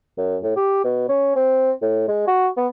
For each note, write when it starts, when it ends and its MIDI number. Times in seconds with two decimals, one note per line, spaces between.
0.18 0.37 42
0.43 0.55 45
0.56 0.84 67
0.84 1.05 47
1.09 1.35 61
1.36 1.71 60
1.82 2.06 45
2.08 2.26 56
2.27 2.48 66
2.57 2.67 59